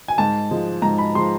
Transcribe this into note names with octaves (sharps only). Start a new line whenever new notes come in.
G#5
G#2 A5
F3 G#3
G#2 A#5
B5
F3 G#3 C6